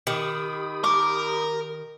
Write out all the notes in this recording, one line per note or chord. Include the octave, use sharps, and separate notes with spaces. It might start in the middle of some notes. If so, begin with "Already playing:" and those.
D#3 G4 B5 D#6
A#4 D6